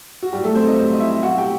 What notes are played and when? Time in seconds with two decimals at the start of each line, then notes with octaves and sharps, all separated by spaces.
0.23 F#4
0.33 A2 F#3 G3 G4
0.44 A3 A4
0.55 C4 C5
0.66 D#4 D#5
0.77 A2 F#3
0.93 D#5
1.00 E4 E5
1.23 B2 F#3 F#4 F#5
1.38 G4 G5